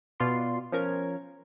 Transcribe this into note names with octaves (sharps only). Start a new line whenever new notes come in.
B2 F4 D5 C6 C7
F3 C#4 A#4 G#6